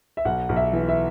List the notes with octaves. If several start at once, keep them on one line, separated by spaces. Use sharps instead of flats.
E5
B1 F#5
B1
E5
E3
E5